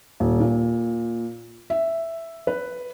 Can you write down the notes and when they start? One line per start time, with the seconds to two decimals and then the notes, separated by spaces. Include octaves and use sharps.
0.20 D#1
0.40 A#2
1.70 E5
2.47 B4